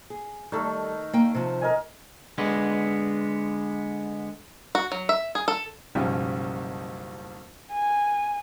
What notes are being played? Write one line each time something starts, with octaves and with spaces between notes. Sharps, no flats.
G#4
D#3 G3 A3 A4
A#3 G5
C3 F3
A#4 D#5 G#5
D3 G#3 B3
F#4
F#3
E5
G#4
A4
F#1 B1 F3 G3 C#4 G5
G#5